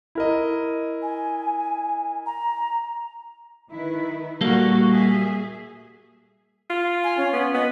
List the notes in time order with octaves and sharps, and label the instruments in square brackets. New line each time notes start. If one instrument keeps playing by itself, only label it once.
[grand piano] E4 A#4 D#5
[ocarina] G#5
A#5
[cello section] D#3 E4 B4
[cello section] A#2 F#4 [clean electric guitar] G3 A#3 A4
[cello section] G#4 E5
[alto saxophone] F4
[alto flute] G#5
C#4
[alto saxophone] B3
[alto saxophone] B3 [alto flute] D#5